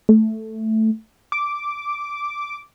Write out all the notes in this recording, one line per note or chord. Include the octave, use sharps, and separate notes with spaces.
A3
D6